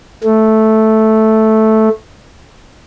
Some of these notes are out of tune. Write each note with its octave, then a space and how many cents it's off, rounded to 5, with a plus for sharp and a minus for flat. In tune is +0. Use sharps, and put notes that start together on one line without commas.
A3 -5